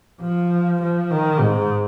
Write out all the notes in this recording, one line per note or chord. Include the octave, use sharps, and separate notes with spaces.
F3
F3
D#3
G#2